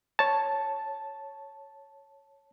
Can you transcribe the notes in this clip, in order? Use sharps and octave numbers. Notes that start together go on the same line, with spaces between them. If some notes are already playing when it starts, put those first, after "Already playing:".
C#5 A5